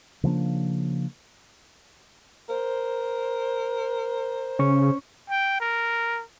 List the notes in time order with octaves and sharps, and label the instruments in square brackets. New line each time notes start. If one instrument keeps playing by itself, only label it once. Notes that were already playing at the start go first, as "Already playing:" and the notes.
[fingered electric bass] C#3 F3 A#3 D4
[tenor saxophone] A#4 [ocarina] C5
[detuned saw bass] C#3 [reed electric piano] C#4 C#6
[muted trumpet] G5
A#4